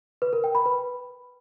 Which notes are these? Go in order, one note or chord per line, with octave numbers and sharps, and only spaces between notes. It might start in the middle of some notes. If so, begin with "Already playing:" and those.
B4
A#4
G5
B5
B4